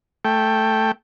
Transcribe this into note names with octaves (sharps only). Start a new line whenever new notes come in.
A3 G5